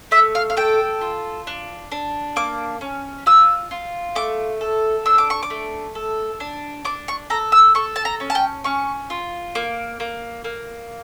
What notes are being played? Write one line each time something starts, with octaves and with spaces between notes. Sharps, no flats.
A3 E5
F5
F5
A4 G5
F4
D4
D4
A#3 D6
C#4
F4 E6
F4
A3 D6
A4
D4 E6
D6
C#6
D6
A3
A4
D4
D4 D6
C#6
A4 A#5
E6
A4 C#6
A5
A#5
C#4
A5
G5
C#4 C#6
F4
A#3 D6
A#3
A#3